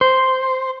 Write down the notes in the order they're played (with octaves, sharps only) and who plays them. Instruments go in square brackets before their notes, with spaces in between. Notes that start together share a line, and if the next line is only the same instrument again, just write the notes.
[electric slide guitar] C5